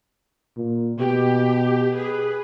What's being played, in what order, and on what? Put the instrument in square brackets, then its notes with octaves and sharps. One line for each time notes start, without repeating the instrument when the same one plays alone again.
[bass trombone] A#2
[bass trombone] B2 [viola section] G4
[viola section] G#4 B4